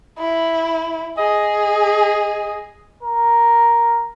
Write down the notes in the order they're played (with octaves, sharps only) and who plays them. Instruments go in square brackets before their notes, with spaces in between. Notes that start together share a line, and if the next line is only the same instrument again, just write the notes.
[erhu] E4
[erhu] G#4 [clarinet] D#5
[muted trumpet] A#4